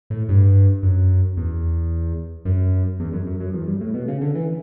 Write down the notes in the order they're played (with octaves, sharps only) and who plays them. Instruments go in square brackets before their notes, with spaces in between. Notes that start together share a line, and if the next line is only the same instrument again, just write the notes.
[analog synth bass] A2
G2
F#2
E2
F#2
E2
F#2
F#2
F#2
E2
G2
A2
B2
C#3
D3
E3